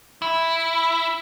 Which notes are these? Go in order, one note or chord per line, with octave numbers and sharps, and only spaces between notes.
E4